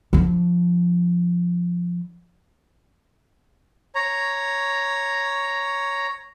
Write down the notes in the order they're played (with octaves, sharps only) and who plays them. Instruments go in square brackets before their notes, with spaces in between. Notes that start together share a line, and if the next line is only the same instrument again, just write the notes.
[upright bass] F3 D4
[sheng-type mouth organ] C#5 A#5